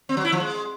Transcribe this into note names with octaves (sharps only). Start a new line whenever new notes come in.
C4
F#3
E4
F3
G#3